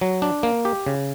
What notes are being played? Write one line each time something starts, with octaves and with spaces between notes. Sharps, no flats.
F#3
D4
A#3
G4
C#3